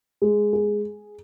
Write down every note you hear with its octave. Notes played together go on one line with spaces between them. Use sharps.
G#3
G#4